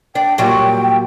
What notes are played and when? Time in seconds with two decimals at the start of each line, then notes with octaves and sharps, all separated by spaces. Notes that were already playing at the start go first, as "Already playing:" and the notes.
0.15 D4 G5
0.38 A#2 F#3 G3 G5